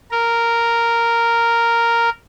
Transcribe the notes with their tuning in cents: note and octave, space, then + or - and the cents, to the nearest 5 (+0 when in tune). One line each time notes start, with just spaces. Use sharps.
A#4 -5